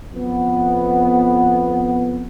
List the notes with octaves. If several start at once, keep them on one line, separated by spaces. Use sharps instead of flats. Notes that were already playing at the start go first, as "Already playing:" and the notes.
F2 B3